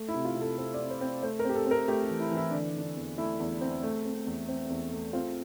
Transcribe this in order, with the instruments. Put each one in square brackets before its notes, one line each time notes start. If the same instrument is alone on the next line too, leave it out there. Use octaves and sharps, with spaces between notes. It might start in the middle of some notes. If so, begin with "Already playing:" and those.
Already playing: [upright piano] A3
E4
C3
F4
C3
A4
C4 A4
D5
C3
C5
C4
A3 C5
A#4
C4 G4
A4
C4
A#4
A3 G4
G4
E3
E4
E3
E4
D3 D4
D3 D4
E2
A3 E4
E2
C4
A3
C4
E2
C4
E2
A3
C4 F4